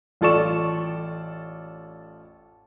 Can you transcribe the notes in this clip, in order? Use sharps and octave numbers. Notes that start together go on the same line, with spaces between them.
A1 F4 A4 D5 C#6 E7